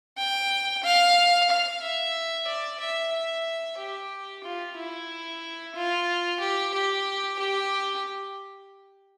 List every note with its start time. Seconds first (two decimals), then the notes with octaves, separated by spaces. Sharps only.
0.18 G5
0.84 F5
1.50 F5
1.82 E5
2.47 D5
2.80 E5
3.13 E5
3.79 G4
4.44 F4
4.77 E4
5.75 F4
6.40 G4
6.74 G4
7.39 G4